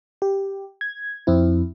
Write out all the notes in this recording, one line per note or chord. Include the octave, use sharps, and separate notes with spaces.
G4
G#6
F2 C4 E4